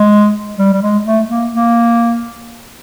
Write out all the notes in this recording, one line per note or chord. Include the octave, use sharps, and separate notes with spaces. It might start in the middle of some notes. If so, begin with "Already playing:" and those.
Already playing: G#3
G3
G3
G#3
A3
A#3
A#3